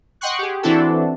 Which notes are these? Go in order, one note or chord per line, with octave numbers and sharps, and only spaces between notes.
D#5 F#5 G5 C6 C#6 F#6
G4 G#4
E3 C4 D4 E4 F#4 A4